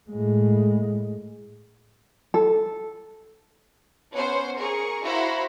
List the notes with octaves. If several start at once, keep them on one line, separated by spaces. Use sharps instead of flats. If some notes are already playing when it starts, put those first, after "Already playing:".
A2 G#3
A4
B3 C#4 C5 F#5
G#4 A#4 C#6
E4 F#4 C5 F5 A#5 B5